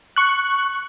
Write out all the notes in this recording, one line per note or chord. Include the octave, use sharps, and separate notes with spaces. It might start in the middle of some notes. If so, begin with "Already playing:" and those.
C#6 F#6